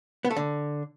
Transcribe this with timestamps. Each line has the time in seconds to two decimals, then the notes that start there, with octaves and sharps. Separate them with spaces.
0.25 B3
0.30 A3
0.36 D3